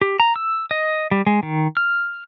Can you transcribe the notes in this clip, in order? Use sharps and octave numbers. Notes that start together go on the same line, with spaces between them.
G4
A#5
E6
D#5
G3
G#3
D#3
F6